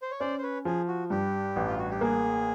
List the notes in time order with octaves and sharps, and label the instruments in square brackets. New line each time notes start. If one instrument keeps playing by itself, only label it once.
[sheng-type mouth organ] C5
C#5
[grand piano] C#4 [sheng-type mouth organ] C5 D5
[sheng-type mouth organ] C5
B4 C#5
[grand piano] F3 [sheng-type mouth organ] G#4
[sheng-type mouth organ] F#4
[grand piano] G2 [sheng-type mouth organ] G4
[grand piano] A1
[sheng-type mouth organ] F4
F#4
G4
[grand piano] A#3 [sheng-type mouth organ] G#4